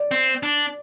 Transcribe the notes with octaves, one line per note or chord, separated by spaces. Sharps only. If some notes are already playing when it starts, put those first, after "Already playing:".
Already playing: D5
C4
D4